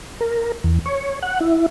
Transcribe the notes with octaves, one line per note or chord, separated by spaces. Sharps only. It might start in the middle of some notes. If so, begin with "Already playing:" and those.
A#4
E2
C#5
F#5
E4